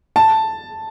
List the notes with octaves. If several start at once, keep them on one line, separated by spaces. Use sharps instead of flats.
A5